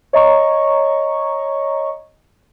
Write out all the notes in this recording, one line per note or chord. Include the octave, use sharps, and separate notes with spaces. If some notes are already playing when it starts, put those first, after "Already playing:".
C#5 D#5 A#5 C#6